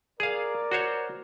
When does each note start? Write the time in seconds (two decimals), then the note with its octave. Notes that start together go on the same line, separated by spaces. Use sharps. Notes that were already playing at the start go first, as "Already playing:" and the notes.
0.20 G#4 A#4 D5 F5
0.71 F#4 C5 C#5